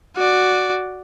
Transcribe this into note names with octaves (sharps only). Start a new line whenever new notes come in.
F#4 D5